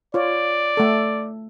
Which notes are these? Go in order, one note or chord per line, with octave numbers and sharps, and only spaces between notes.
F4 C#5 D5
A3 A4